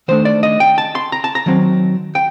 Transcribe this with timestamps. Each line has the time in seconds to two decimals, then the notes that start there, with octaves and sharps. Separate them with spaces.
0.08 D#3 A3 D4 C5
0.25 D5
0.43 D#5
0.60 G5
0.78 A5
0.95 C6
1.12 A#5
1.24 A5
1.35 A#5
1.46 D#3 F#3 C4
2.15 G5